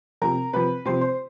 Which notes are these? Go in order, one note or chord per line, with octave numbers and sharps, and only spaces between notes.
C3 F3 A#4 A#5
C3 F3 B4 B5
C3 F3 C5 C6
C5 C6